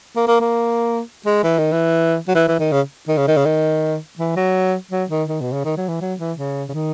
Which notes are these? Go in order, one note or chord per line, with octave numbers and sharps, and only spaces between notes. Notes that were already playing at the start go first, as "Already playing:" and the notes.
A#3
A#3
A#3
G#3
E3
D#3
E3
F#3
E3
E3
D#3
C#3
D#3
C#3
D#3
C#3
D#3
E3
F#3
F#3
D#3
D#3
B2
C#3
D#3
F#3
E3
F#3
E3
C#3
C#3
D#3